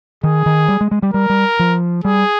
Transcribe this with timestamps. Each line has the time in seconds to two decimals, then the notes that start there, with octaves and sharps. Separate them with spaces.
0.23 D#3 G#4
0.46 D#3
0.68 G3
0.81 G#3
0.91 G#3
1.02 G3
1.14 G3 A#4
1.29 G3
1.59 F3
2.04 G3 G#4